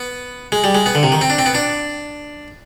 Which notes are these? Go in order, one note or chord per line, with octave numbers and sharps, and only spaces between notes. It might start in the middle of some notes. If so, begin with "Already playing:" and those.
Already playing: B3
G#3
G3
G#3
B3
D3
C3
D#3
C4
D4
C4
B3
D4